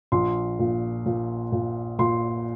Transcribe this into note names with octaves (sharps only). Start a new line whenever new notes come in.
A#1 C6
A#2
A#2
A#2
A#2 C6